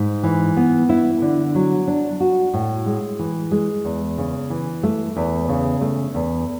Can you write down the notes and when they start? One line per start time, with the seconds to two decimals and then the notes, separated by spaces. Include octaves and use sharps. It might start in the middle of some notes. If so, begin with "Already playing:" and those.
Already playing: G#2
0.23 E3
0.57 B3
0.89 E4
1.22 D3
1.55 F#3
1.88 D4
2.20 F#4
2.53 A2
2.86 G#3
3.19 E3
3.51 G#3
3.85 E2
4.18 C#3
4.50 E3
4.83 A3
5.16 E2
5.49 C#3
5.81 A3
6.15 E2